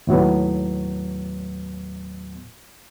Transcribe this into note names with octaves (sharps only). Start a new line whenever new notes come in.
D#2 A2 F#3 B3